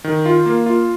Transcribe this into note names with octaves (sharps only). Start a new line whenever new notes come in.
D#3
F4
A#3
F4